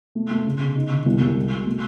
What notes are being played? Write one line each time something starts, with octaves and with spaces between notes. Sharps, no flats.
A3
A3
C#3
C#3
D#4
D3
C2
C2
G#3
B2
A3